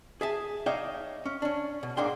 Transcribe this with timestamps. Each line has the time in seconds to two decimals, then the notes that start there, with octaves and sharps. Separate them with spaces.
0.21 G#4 E5 A5
0.66 D#4 C#5 D5 E5 F5 G5
1.26 C#4
1.42 C#4 D4
1.83 B2
1.97 G#2 A#3 D4 G5 C6